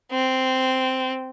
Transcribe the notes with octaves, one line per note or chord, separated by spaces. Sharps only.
C4